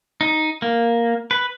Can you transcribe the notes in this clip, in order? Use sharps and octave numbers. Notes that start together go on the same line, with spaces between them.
D#4
A#3
B4